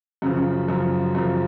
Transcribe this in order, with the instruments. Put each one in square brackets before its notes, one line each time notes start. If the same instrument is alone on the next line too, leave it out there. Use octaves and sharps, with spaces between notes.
[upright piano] F#2 C#3 F3
F#2 C#3 F3
F#2 C#3 F3